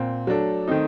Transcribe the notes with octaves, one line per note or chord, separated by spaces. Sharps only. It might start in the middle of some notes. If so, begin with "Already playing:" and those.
Already playing: A#2 C4
F#3 A3 D4 A4
D#3 A3 C4 D#4